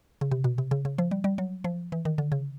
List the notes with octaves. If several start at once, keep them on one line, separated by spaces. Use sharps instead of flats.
C#3
C3
B2
C3
C#3
C#3
F3
G3
G3
F#3
F3
E3
D#3
D3
C#3